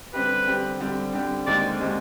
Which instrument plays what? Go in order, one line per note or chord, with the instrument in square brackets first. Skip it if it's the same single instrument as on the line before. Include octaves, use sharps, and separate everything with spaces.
[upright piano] D3 G3 C4 G4 [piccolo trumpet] B4
[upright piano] D3 G3 C4 G4
D3 G3 C4 G4
D3 G3 C4 G4
[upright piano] D#2 D3 G#3 C4 G4 [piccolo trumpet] D5
[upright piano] D3 G#3 C4 G4